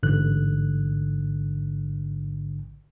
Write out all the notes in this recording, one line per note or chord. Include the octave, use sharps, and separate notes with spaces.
A1 G#2 D3 F#6